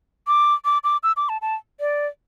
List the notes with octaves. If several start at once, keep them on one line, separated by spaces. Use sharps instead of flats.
D6
D6
D6
E6
D6
A5
A5
D5